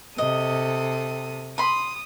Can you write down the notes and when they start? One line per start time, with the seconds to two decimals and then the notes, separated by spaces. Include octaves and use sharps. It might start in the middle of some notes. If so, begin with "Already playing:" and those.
0.18 C3 A4 D#5 D#6
1.58 B5 C6 D#6